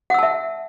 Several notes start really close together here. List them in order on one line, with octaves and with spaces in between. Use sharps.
F#5 E6 A5 E5